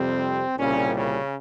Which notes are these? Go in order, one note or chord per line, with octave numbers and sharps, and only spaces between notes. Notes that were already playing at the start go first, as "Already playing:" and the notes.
Already playing: F2 C3 G3 C4
C2 A#2 C#3 G3 C#4
C#3 C#4